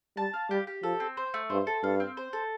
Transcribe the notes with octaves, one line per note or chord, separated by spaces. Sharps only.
G3 A5
F5
G3 G4
G4
F3 A4
C4
C5
A3
G2 C5
A4
G2 F5
C4
C5
A4